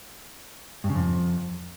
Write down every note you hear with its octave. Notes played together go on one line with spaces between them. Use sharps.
G2
C#3
F2